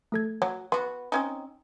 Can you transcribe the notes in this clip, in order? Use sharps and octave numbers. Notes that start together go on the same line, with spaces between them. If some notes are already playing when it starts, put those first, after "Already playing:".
A3 A4 G#6
F#3 C#5
B3 F#4 C6
C4 C#4 D#4